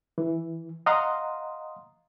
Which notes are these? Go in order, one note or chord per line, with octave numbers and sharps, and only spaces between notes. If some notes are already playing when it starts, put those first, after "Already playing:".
E3
D#5 F5 F#5 A#5 C6 D#6